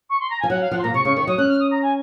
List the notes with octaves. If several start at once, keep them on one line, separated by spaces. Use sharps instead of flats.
C#6
C6
A#5
F3 G#5
F#3 F#5
F5
F3 F#5
C6
A#2 A#5
C3 C#6
C#3 C#6
D#3 C#6
F#3 D#6
C#4 F#6
F6
D#6
A#5
G#5